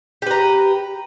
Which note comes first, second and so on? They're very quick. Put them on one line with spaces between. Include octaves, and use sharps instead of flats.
G4 B4 A#5